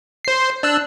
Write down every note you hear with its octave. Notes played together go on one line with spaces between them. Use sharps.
C5 C7
D4 E6 F#6